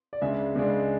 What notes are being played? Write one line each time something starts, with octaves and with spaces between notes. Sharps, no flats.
D5
C#2 C#3 G#3 D4 E5
C#2 C#3 G#3 D4